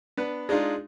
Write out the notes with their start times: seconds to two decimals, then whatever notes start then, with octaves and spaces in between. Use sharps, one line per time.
0.17 B3 D4 B4
0.49 G#3 D4 D#4 F4